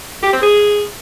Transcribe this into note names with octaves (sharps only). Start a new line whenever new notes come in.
G4
C4
G#4